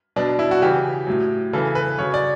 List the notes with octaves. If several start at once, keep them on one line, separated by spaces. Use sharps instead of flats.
B2 F#3 D4
E4
F#4
C#3 E3 G4
A2 F#3
C#3 E3 A4
B4
C#3 F#3 C#5
D5